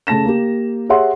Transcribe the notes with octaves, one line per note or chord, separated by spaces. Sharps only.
C#3 A3 A5 A#6 E7
A#3 G4
G4 G#4 C#5 E5 F#5 C6